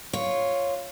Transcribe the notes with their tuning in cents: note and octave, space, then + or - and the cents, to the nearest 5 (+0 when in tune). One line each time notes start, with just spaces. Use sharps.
F4 +0 C#5 +0